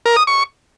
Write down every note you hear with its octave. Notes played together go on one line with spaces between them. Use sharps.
A#4
D#6
C#6